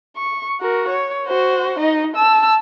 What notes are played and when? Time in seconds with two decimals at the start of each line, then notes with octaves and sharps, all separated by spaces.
0.17 C#6
0.60 F#4 A#4
0.90 C#5
1.27 F#4 C5
1.80 D#4 D#5
2.16 A5 E6